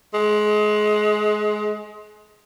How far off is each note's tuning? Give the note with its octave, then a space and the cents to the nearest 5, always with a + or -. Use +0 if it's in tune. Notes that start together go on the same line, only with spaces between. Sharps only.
G#3 +25